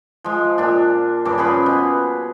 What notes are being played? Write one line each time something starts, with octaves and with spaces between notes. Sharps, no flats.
F3 G#3
A#2 D4
G2 C#3 D6
F3 C#4 G#4 B4
B2